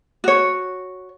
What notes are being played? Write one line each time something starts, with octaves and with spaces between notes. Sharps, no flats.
F#4 C#5